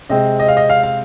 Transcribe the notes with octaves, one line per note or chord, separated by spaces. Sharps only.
C3 G#3 C4 D#5
D#5
F5
D#5
F5
F5